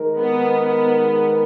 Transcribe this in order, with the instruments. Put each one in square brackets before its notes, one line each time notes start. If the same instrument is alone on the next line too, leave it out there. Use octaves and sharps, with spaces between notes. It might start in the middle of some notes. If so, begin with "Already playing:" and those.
Already playing: [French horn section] D#3 G#3 D#4 A#4
[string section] B3
B3